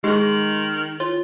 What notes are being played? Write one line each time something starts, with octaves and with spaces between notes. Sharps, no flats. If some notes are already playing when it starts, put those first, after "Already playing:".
D#3 G#3 G4 G#4
F4 C#5